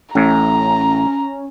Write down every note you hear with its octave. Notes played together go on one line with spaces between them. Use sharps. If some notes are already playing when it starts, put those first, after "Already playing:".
A1 A2 C#4 A#5